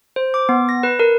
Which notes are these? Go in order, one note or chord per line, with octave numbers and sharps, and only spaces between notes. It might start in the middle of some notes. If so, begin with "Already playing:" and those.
C5
D6
B3
A#6
B4
A#4